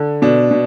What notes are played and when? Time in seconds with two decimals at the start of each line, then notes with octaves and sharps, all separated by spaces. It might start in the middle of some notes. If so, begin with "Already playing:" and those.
Already playing: D3
0.22 B2 D4
0.51 B2